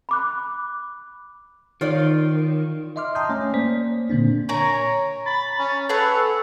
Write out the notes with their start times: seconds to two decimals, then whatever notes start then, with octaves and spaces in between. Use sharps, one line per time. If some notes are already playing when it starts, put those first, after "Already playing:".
0.09 B5 D6 F#6
1.81 D#3 F4 C#5 D5
2.96 D#5 E5 C6 D6 F6
3.15 G5 A5 A#5 C6 D#6 G6
3.29 A3 C#4 C#5 G#5
3.54 A#3 C5 D5 B6
4.10 A#2 D3 A#3 C4 D4
4.49 A#4 C#5 G#5 A#5
5.26 B5 A6
5.59 C#4
5.89 G#4 A4 B4 C#5 F#5